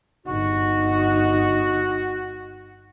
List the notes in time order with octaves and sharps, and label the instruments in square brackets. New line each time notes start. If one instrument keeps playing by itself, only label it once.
[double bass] G1 D#4 [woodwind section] F#4